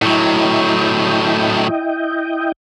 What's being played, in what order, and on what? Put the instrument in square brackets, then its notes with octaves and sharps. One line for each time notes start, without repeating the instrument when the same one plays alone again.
[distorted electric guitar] A2 F#3 [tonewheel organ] E4 D#5 G5